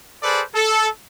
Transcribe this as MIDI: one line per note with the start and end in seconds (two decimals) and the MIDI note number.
0.23 0.43 68
0.23 0.43 69
0.23 0.43 71
0.23 0.43 72
0.23 0.43 74
0.54 0.88 69